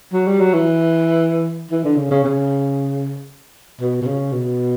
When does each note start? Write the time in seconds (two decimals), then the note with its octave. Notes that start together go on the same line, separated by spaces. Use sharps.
0.13 F#3
0.27 G3
0.40 F#3
0.53 E3
1.71 E3
1.84 D3
1.96 C#3
2.11 C#3
2.24 C#3
3.81 B2
4.02 B2
4.06 C#3
4.32 B2